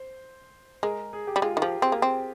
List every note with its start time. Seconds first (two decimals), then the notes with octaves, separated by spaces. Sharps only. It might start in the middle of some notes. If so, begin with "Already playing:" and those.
Already playing: C5
0.83 G#3 A#4
1.13 G#4
1.27 G4
1.36 G3
1.42 G#3 F4
1.57 D#3
1.62 F3 G4
1.82 C4 G#4
1.92 A#3
2.02 C4